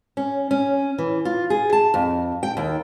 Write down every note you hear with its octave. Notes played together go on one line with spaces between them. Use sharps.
C#4
C#4
E3
F4
G#4
A5
F2
G5
D#2